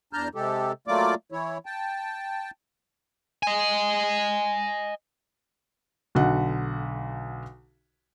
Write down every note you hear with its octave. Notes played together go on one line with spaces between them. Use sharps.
E2 D4 A5 A#5 F6 G6
C3 G#3 G4 A4
F#3 A3 A#3 F4 D5 D6
E3 E4 C#5
G5 A5
D#5 G#5
B1 D3 F#5